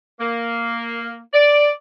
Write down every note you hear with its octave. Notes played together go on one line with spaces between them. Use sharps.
A#3
D5